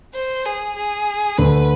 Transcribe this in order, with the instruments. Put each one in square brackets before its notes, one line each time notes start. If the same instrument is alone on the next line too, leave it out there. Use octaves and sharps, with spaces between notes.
[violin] C5
G#4
G#4
[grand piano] D2 D3 [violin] B4